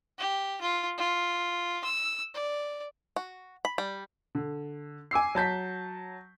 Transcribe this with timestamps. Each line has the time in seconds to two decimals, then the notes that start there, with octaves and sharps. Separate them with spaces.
0.19 G4
0.61 F4
0.98 F4
1.84 E6
2.35 D5
3.16 F#4
3.65 B5
3.78 G3
4.35 D3
5.11 G#5 D6 E6 C7
5.35 F#3 A5 G6 B6